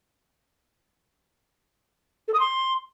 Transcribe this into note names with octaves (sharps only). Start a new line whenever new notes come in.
A4
D#6
C6